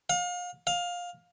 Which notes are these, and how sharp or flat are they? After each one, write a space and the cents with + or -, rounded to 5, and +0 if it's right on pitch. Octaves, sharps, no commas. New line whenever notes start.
F5 +35
F5 +15